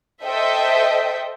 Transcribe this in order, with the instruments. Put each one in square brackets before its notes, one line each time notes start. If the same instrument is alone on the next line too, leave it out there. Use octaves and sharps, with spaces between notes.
[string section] A4 C5 D#5 E5 G5